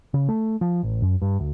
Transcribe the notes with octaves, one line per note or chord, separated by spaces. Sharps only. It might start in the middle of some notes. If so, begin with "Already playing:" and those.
C#3
A3
F3
A1
F#2
G2
D2